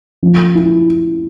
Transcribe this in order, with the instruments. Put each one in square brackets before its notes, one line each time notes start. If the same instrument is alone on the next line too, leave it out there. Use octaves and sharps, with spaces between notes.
[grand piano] F3
E4